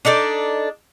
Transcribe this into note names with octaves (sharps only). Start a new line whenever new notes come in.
D4 D#4 A4 D5